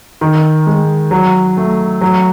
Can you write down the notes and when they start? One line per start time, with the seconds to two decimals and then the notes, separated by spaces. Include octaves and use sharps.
0.21 D#3
0.67 G#3
1.11 F#3
1.57 A3
2.01 F#3